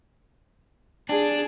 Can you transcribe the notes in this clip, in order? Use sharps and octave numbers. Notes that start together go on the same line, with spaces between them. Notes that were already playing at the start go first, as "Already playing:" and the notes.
D4 G#4